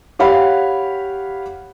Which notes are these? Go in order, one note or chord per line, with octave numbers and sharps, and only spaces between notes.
G4 C#5 F5 F#5 B5